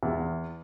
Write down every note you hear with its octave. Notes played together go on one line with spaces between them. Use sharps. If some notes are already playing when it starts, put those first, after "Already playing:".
E2